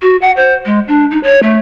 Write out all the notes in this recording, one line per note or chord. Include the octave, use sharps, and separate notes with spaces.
F#4
F#5
C5
G#3
D4
D#4
C#5
A3